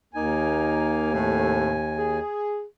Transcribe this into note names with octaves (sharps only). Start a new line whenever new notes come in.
D#2 A#3 D#4 G#5
A2 C3 A3
G#4